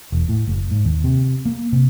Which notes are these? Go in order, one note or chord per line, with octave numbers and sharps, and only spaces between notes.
E1
A2
F#1
G#2
D#2
C3
A#3
C3